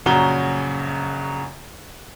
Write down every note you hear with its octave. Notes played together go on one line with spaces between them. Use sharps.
A#1 F#2 C#3 F#4 A#5 G7